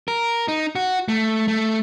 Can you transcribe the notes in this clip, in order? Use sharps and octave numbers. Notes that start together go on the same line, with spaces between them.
A#4
D#4
F#4
A3
A3